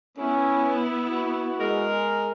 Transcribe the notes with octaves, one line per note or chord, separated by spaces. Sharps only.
B3 C#4 E4
F#4
G#3 A#4